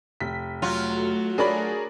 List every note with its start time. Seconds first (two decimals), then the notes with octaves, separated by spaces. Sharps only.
0.21 F1 B6
0.62 F#3 A3 F4 F#4
1.38 D4 G#4 A#4 C#5 D5 B5